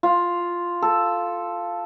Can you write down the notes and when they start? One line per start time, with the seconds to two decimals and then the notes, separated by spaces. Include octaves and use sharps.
0.03 F4
0.82 A4